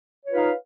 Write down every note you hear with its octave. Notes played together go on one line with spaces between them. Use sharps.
D#4 F4 B4 C#5 F5